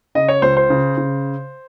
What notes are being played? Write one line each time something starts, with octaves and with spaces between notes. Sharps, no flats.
C#3 D#5
C#5
C#2 C5
C5
C#3
C#3